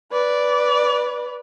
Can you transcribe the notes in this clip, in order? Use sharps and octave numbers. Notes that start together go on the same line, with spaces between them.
B4 D5